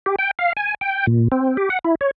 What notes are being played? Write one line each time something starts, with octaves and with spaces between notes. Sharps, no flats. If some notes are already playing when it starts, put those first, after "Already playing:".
G4
G5
F5
G#5
G5
A#2
C4
G4
F#5
E4
C#5